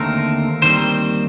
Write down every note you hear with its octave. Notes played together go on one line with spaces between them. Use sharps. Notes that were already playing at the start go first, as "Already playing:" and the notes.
Already playing: D#2 D3 A3 C4 A#4
D#2 D#3 G3 C4 C5